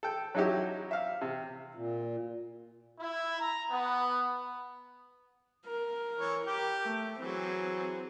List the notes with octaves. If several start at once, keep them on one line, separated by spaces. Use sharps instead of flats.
A4 G5
F#3 C#4 D#4 E4 F#4 G4
E5 F5
C3
A#2
E4
A#5
B3
A#4
E3 C#5
G4 G5 D6
A3
E3 F#3 C4 G#4